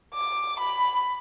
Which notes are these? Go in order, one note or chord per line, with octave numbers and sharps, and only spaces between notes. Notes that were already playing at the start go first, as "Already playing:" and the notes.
D6
B5